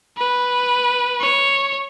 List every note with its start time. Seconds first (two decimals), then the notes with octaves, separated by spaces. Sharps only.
0.18 B4
1.20 C#5